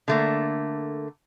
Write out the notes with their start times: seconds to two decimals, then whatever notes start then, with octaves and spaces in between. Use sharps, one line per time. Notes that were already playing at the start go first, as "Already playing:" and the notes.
0.08 D3 A3 A#3